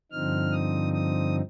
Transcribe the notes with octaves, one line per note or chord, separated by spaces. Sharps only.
G2 D3 F3 C4 D#4 F6
D#6
D#6